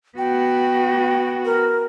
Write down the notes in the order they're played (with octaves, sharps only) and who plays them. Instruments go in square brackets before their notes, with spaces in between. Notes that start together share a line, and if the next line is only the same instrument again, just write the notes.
[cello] B3 F#4 [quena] G5
[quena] A#4